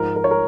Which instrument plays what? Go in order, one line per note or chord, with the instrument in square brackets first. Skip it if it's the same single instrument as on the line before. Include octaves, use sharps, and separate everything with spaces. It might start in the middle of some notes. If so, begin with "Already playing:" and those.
Already playing: [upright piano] G#2 F3 A#4
A#4
C#5
A#4